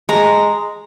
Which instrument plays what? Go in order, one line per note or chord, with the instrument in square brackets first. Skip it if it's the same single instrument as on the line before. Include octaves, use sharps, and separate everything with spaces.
[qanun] G#3 [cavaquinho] A#5